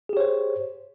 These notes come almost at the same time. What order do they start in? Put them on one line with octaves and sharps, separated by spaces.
G#4 G4 C#5 C5